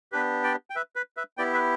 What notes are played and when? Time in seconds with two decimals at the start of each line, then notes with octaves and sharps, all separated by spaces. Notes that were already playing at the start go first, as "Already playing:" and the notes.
0.12 B3 D4 G4 B4
0.43 D5 G5
0.70 G5
0.76 B4 E5
0.96 B4
1.17 B4 E5
1.37 B3 E4 G4 D5 G5
1.53 B4 E5